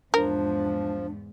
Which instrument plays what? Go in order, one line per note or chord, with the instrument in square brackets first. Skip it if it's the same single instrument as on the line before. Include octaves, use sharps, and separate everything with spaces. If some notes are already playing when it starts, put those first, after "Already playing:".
[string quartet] E2 G#2 [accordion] F3 [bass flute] D4 [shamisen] A#4